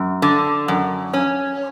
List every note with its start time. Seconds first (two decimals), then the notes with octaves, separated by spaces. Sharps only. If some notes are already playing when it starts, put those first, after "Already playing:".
Already playing: F#2
0.22 D3
0.68 F#2
1.14 C#4